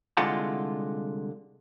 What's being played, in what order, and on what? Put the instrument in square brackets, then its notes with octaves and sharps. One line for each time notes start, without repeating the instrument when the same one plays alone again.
[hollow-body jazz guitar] C2 D3 G#3 F4 F#5 A5